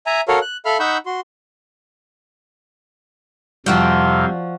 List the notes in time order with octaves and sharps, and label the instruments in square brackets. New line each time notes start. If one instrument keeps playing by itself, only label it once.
[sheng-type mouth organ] E5 G#5 A#5
F#4 A4 A#4 C#5 F5
F#6
A4 E5 F5 B5 F6
D#4 F#5 B5 C#6 E6 G6
F#4 C6
[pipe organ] F2 C3 F5 [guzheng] F3 F#4 G5 [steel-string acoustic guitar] G3